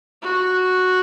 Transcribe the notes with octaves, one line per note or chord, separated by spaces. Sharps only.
F#4